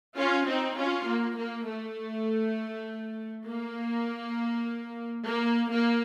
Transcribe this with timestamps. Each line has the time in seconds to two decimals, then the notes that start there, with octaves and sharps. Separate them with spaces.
0.18 C#4 F4
0.48 C4 D#4
0.78 C#4 F4
1.08 A#3
1.38 A#3
1.68 A3
3.47 A#3
5.27 A#3
5.72 A#3